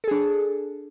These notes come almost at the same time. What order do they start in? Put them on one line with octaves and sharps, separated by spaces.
A4 G#4 D4